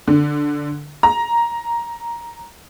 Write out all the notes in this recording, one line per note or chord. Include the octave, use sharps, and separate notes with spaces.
D3
A#5